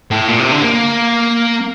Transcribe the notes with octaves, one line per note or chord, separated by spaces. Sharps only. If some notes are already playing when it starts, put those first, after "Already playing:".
A2
A#2
C3
D3
A#3